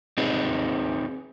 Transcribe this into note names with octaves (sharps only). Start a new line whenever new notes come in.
C4 D#4 G#4 B4